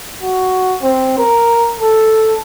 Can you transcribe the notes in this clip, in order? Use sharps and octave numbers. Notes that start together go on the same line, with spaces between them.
F#4
C4
A#4
A4